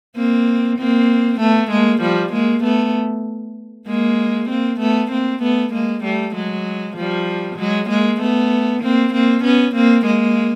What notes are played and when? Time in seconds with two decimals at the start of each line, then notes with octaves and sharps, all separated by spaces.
0.16 A#3 C4
0.79 A#3 C4
1.41 A3 B3
1.71 G#3 A#3
2.02 F3 G3
2.33 G#3 A#3
2.64 A3 B3
3.87 G#3 A#3
4.50 A#3 C4
4.80 A3 B3
5.11 A#3 C4
5.42 A3 B3
5.73 G#3 A#3
6.04 G3 A3
6.35 F#3 G#3
6.97 F3 G3
7.58 F#3 G#3
7.90 G#3 A#3
8.21 A3 B3
8.83 A#3 C4
9.14 A#3 C4
9.44 B3 C#4
9.75 A#3 C4
10.06 G#3 A#3